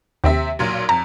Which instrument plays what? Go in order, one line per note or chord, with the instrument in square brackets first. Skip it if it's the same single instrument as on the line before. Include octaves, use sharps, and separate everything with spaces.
[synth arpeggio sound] D#2 [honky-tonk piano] C3 C4 E5
[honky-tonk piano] B1 A#2 F#3
[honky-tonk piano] F2 [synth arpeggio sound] A#5